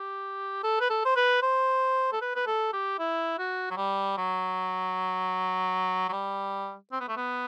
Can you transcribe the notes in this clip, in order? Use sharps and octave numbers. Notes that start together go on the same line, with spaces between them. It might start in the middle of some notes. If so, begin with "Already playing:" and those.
Already playing: G4
A4
B4
A4
C5
B4
C5
A4
B4
B4
A4
G4
E4
F#4
F#3
G3
F#3
F#3
G3
C4
B3
A3
B3